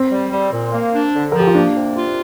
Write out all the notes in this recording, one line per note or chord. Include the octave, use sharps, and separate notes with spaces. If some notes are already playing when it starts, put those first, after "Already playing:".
Already playing: C4
G3
G3
A#2
A#3
D4
D3
F3 A#4
G4
F4
A#3 D4
C3
F4